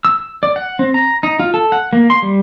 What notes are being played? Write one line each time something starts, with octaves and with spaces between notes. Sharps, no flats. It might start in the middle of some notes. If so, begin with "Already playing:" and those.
E6
D5
F#5
C4
A#5
D#4
F4
A4
F#5
A#3
C6
G3